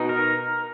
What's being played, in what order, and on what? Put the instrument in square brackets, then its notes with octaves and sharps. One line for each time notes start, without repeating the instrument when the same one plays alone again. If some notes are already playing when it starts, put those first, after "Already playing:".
Already playing: [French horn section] B2 [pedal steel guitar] D#4
[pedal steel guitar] A#4